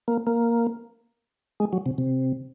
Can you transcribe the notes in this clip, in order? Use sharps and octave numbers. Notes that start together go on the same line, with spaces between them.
A#3
A#3
G#3
F#3
C3
C3